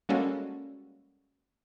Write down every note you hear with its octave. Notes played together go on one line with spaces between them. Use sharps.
G3 G#3 A#3 C#4 F#4 A4